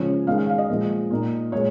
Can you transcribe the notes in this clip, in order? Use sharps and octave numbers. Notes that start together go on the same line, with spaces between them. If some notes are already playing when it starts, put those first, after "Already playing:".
Already playing: C#3 F3 G#3 C#4 C#5
D#3 G#3 C#4 F5
F5
F5
D#5
A#2 F3 G#3
A#2 A#3 D#4
A#2 G#3 C#5